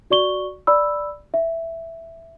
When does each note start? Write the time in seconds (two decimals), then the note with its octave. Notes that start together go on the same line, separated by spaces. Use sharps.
0.10 F#4 D5 C#6 G7
0.67 D5 B5 E6
1.34 E5